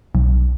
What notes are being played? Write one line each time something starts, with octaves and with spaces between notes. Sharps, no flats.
B1